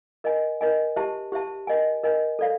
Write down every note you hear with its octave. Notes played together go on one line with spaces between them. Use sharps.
A#4 D#5 G#5
A#4 D#5 G#5
G4 C5 E5 A5
G4 C5 E5 A5
A#4 D#5 G#5
A#4 D#5 G#5
A4 D5 F5